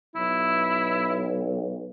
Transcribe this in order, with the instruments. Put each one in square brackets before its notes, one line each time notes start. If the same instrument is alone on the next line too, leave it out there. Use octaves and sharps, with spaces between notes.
[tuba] B1 [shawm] E4